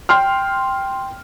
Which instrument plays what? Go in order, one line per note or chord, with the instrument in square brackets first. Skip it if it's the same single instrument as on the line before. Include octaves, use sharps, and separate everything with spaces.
[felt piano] G5 C6 F6